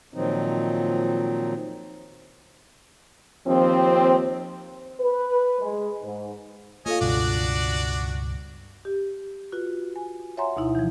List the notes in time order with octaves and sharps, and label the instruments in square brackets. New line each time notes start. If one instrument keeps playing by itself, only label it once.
[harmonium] A#2 D#3 F3 F#3 C4 D#4
[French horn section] D#2 F3 C4
B4
G#3
G#2
[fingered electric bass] A#3 [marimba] F4 A4 F5 [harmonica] C#5 D#5 G#5
[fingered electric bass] C#2 G2 B2 [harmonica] D4 F#4 D5
[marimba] G4
F4 F#4 B4
G#5
C#5 E5 F#5 G#5 A#5 C6
D2 B2 D#4 E4
E3 F3